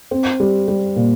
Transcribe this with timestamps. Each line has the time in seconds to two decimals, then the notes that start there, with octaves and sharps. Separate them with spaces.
0.11 C4
0.40 G3
0.68 G3
0.96 A#2